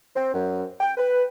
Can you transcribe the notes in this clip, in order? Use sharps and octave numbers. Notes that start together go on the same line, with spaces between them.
C4
F#2
G5
B4